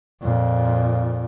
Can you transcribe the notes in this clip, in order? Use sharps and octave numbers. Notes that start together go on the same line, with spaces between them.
F2 A#2